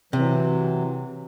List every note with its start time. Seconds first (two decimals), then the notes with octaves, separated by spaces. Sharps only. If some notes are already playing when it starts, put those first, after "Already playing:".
0.13 C3 E3 F#3